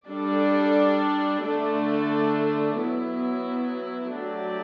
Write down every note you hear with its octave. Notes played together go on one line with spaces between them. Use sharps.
G3 D4 A4 D5
D3 A3 D4 A4 D5
F#3 B3 E4
F#3 A3 D4 G4 D5